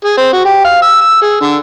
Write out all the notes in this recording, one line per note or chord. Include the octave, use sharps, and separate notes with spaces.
G#4
C4
F#4
G4
F5
E6
E6
G#4
D3